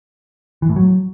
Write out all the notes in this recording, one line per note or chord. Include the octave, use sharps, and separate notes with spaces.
E3
A2
F#3